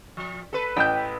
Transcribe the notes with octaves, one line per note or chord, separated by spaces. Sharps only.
F3
A4 B4
A1 G5 E6 G6